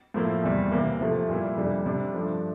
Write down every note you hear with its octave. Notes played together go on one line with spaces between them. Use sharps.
A2 F3 A#3 E4
E2 C3 G3
C3 E3 A#3
C3 F3 A3
A#2 G3 A#3 E4
F2 C3 G3 D4
C3 G3 D4
G2 F3 A3 D4